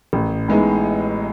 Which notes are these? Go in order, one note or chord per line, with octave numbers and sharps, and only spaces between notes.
A1
A2 G#3 B3 D#4